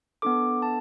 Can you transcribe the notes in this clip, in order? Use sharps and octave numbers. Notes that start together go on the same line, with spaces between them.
B3 D4 A4 D6
A5